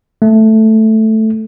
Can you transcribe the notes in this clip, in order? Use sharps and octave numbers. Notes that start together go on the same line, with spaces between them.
A3